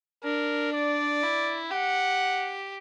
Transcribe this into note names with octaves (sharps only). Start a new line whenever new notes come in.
D4 A#4
D5
E4
G4 F#5